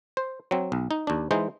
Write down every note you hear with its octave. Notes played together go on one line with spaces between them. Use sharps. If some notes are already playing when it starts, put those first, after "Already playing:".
C5
F#3 C4
B1
D#4
D#2 D4
E3 G#3 D#4 C5